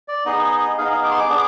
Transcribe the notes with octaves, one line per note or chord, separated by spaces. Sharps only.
D5
B3 D#4 G#4 D#5
B3 D#4 G#4 F5
D#5
F5
D6
C6
D6
B3 D4 G#4